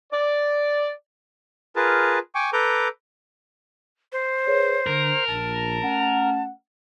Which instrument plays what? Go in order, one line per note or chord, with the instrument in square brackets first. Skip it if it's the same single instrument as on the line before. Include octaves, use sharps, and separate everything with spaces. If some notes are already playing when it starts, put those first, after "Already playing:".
[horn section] D5
[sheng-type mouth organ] F4 G#4 A#4 B4 A5
G5 G#5 C#6 D6
A4 B4 A#5 D6 G6
[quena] C5
[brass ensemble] G#4 B4 C#5
[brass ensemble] D3 [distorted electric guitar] A#4
[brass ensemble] A#1 [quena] A5
[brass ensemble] A3 C#4 F#5